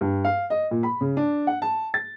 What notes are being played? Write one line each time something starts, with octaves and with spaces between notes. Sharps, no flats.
G2
F5
D#5
A#2
B5
C#3
D4
F#5
A5
A6